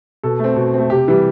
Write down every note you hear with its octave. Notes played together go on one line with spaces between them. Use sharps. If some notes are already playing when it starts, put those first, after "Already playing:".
B2 A4
A3 C4
B2
A3 C4
C3 G4
E3 G3